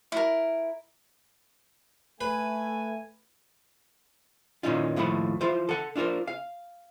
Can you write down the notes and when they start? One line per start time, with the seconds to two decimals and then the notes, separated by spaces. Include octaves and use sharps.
0.12 E4 A#4
2.21 A3 B4 G#5
4.63 A#2 D#3 E3 C#4 D#4 F4
4.96 D#2 A2 F3 F#5 B5
5.41 E3 F4 C5
5.69 A4 F#5
5.96 D4 F4 F#4 A#4 C5
6.27 F5